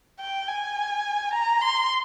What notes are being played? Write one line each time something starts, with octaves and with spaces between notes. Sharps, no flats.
G5
G#5
A#5
C6